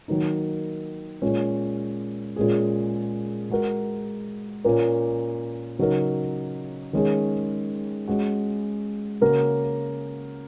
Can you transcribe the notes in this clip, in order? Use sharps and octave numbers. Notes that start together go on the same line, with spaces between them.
D#3 F#3 A#3 D#4
A#2 G#3 C#4
A#2 G#3 C#4 G#4
G#3 F#4 A#4
A#2 A#3 C#4 A#4
C#3 F#3 D#4 A#4
D#3 G#3 C#4 G#4
G#3 C#4 F#4
C#3 A#3 C#4 F#4 A#4